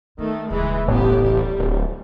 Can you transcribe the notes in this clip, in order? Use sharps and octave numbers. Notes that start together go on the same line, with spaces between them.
D#3 A3 B3
D#1 C#2 E3 G#3
A1 B3 G4
G3
D1